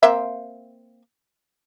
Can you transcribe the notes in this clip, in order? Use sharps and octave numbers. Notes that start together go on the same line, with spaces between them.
A#3 C4 E5